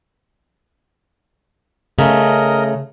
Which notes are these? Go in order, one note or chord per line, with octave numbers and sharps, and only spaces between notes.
C#3 A3 A#4 D#5